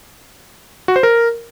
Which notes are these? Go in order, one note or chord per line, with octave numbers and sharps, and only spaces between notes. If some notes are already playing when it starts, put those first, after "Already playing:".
F#4
C5
A#4